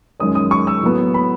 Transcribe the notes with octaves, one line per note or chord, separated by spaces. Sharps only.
F#2 D#3 G#3 C#4 D#6
D#6
C#6
E6
A2 F#3 B3
B5